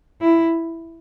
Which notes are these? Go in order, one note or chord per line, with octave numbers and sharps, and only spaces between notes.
E4